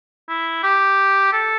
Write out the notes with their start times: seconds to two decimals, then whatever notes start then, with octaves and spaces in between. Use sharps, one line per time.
0.29 E4
0.63 G4
1.33 A4